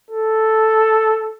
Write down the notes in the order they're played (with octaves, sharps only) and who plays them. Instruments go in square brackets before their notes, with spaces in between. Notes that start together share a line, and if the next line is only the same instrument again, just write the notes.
[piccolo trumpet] A4